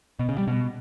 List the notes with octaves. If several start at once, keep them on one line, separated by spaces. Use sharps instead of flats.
B2
C#3
G3
B2